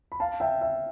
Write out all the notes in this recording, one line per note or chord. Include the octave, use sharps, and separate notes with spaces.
B5
F5 A5
E5 G5
E5